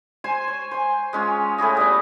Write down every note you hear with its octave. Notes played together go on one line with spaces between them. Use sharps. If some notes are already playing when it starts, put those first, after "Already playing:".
C5 G#5 C6
C#5
C5 G#5
G#3 C#4 F4
A2 E4 G#4 D#5
G3 B3